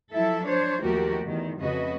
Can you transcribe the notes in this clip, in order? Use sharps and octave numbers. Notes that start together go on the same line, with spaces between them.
F3 F#3 E4 A4 E5
D4 C5 C#5
D#2 F3 A3 F#4 G4 A#4
E2 D#3
F2 C#3 A3 F#4 B4 D#5